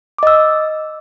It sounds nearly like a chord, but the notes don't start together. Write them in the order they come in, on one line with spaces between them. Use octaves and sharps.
D6 D#5 E6